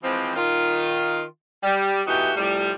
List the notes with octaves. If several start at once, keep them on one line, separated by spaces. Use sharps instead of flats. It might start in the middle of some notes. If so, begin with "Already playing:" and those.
E3 F3 G#3 C4
D#3 F4
G3
B2 E3 A3 D#4 F#4 G4
A2 C3 F3 G3